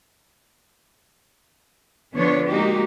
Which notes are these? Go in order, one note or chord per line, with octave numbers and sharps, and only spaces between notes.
D3 F3 B3 D4 C#5
G#3 A#3 D#4 F#4 G4